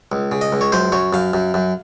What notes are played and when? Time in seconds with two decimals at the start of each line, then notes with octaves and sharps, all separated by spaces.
0.12 C#2
0.32 C#3
0.41 D#5
0.53 C#2
0.61 C#5
0.72 F#2 C5
0.92 F#2 C#5
1.13 F#2 F5
1.34 F#2
1.54 F#2